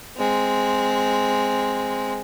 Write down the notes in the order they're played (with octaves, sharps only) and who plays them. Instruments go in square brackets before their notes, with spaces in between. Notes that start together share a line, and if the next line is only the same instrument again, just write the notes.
[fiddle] G#3 C4